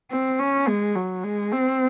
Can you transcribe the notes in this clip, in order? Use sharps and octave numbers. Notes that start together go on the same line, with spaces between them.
C4
C#4
G#3
F#3
G#3
C4